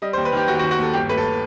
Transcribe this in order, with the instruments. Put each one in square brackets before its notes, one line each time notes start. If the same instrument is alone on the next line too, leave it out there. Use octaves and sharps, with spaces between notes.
[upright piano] G3 D#5
C5
D#2
B4
D#3 G4
D#2 F#4
G4
F#4
D#2
F#4
D#2 A4
G1 G4
A3 B4
A4